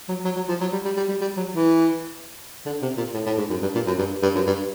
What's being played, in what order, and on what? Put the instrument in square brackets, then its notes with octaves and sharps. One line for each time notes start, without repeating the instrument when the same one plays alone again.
[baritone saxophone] F#3
F#3
F#3
F3
F#3
G3
G3
G3
G3
G3
F#3
E3
D3
C3
A#2
A2
A2
G#2
F#2
G2
A#2
F#2
G2
G2
F#2
G2